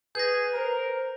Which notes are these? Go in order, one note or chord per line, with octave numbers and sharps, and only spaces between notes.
G#4 B4 G6 A#6
A#4 C5 A#5